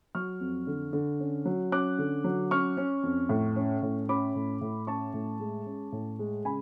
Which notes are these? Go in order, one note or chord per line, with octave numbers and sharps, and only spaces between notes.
F#3 C#6 F6
F2
D3
D3
C#4
F#3
C#4 D6 F#6
D3
F#3
C#4 C#6 F6
C#4
F2
A2
C#4
A2
C#4 B5 D6
A2
A2
C#4 A5 C#6
A2
G#3
C#4
A2
G#3
C#3 G#5 B5